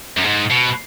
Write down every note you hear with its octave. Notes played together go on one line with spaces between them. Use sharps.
F#2
G#2
B2